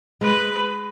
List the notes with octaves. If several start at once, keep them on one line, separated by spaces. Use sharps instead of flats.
G#3 B4